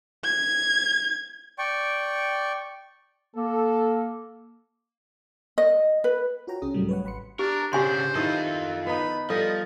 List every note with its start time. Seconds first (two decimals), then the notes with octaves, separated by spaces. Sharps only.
0.24 G#6
1.58 D5 G5 C#6
3.36 A#3 A4
5.58 D#5
6.04 B4
6.47 F4 F#4 A#4 C#5 G5 A#5
6.62 C2 C#4 G#4 D#6
6.74 G#2 C3 F#3 G3 A3
6.89 B4 C#5 F#5
7.04 G#1 F#5 B5 C6 C#7
7.39 D4 G4 A#4
7.73 C#3 D4 G4 C5 G#5 C6
8.15 D#3 E4 F4 A4 D#5
8.87 B3 D#4 B5
9.30 F3 G3 A4 D#5